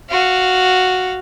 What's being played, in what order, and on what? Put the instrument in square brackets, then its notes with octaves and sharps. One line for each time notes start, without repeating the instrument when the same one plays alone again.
[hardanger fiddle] F#4 F5